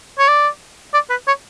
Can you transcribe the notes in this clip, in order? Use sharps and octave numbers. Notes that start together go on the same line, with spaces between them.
C#5
D5
D5
B4
C#5